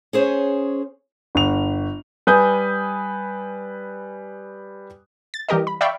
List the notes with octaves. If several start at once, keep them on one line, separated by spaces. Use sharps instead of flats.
C#4 G#4 C5 C#5
G1 F7
G3 B4 G#5 D#6 G6
A6
E3 G3 G4 A#4 D#5
B5
D5 E5 F5 G5 B5 C#6